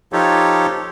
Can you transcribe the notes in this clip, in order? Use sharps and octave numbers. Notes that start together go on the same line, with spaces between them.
F3 D#4 F4 G4 A4 C#5